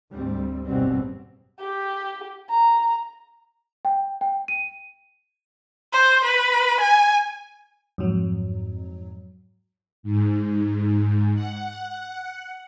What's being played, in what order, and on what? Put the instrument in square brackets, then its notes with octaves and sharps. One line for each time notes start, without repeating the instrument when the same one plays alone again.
[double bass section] D2 G#2 G3 C4
G#1 F#2 B2 G3 B3 C4
[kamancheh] G4
A#5
[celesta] G5
G5
D#7
[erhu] C5
B4
G#5
[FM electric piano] F2 G#2 F#3
[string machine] G#2
F#5